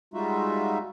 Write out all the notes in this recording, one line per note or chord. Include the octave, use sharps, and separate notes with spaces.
G3 G#3 D#4 F4 F#4 E5